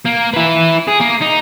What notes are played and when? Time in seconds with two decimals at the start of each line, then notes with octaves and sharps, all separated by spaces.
0.06 A#3
0.33 E4 B4
0.88 G#4
1.01 A#3
1.22 D#4